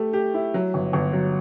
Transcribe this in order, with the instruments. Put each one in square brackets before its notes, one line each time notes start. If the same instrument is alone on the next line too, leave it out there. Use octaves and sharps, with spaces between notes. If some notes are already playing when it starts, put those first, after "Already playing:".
Already playing: [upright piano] A3 G4
G4
E4
F#3
G1
G1
F#3